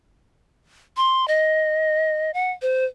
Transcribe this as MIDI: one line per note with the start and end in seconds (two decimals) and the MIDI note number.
0.97 1.28 84
1.28 2.31 75
2.34 2.51 78
2.62 2.85 72